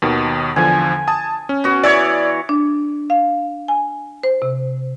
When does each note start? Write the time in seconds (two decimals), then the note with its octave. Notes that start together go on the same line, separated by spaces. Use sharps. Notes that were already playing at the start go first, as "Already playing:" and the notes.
0.02 D#2 B2 D#3
0.56 E2 D3 F3 G#5
1.08 A5 D#6
1.49 C#4
1.64 B3 F#4
1.84 E3 C#5 D5 E6 G#6
2.49 D4
3.10 F5
3.68 G#5
4.23 C5
4.42 C3